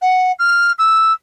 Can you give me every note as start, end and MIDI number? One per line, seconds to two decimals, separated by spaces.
0.02 0.32 78
0.39 0.72 89
0.78 1.12 88